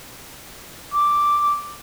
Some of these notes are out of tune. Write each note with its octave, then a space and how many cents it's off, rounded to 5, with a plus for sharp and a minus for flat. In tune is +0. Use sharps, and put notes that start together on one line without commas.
D6 +0